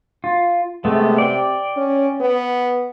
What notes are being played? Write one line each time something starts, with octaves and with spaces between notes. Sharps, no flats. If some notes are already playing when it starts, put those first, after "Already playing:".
F4
C3 G#3 A3 B3
D5 G5
C#4
B3